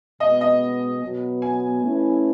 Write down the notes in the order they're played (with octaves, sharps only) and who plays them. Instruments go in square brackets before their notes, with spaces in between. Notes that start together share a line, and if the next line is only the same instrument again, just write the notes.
[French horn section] B2 G#3 B3 [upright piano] D#5
[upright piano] D#5
[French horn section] B2 F#3 B3
[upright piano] G#5
[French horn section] A3 C#4 E4 B4